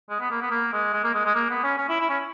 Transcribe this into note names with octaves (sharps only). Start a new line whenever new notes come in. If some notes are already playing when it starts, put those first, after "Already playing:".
G#3
B3
A#3
B3
A#3
G#3
G#3
A#3
G#3
G#3
A#3
B3
C#4
C#4
E4
E4
C#4